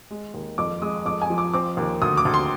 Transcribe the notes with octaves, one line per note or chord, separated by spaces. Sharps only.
G#3
D#2
F2 D6
G#3 D#6
F2 D6
G#5
F3
D6
C4 D6
D#2
D2 D#6
D6
D2
C6